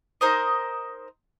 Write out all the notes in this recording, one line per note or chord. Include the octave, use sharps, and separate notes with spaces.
D#4 A#4 C5 D#5